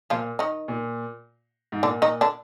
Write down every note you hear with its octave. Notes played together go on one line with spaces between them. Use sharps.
A#2 F3 F4
D#3 D#4
A#2
G#2
A#2 D3 D4
D#3 D#4
D3 D4